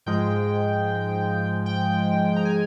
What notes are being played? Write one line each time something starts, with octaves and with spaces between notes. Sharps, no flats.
G#2 F3 G#3 G5
G5
A#5
G#5